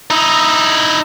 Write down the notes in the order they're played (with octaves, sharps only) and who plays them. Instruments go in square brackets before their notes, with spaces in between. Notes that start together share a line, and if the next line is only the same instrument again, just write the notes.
[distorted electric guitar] D#4 E4